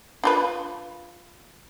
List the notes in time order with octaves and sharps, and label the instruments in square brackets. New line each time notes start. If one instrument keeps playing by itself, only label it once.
[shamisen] D4 F4 B4